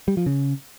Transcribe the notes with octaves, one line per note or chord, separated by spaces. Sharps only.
G3
F3
C#3